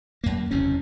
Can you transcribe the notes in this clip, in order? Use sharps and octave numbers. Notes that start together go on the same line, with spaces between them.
F#2 A#3
F#1 E2 C3 C#4